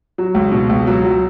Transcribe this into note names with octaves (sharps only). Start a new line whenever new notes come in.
F#3
C#2
B2
C#2
F#3
F#3